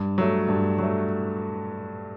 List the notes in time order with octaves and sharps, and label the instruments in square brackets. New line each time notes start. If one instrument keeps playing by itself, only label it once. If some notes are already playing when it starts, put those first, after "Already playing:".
Already playing: [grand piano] G2
F#3 A3
G2
F#3 A3